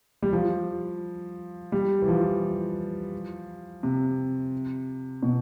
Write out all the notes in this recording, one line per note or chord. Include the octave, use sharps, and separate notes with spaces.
G3
F3
G3
E3
F3
C3
B2